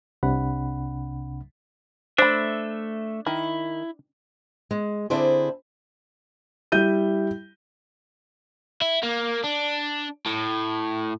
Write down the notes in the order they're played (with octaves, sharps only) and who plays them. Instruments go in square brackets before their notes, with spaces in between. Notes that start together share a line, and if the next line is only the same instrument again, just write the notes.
[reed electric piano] C2 C3 D4 F#5 B5
[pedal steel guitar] A3 E5 [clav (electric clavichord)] D4 [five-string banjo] C5 B5
[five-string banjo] D#3 [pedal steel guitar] E4
[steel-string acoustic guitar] G#3
D3 C4 D4 E4 G#4 C5
[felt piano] G3 E4 G6 D#7
[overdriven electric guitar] E4
A#3
D4
A2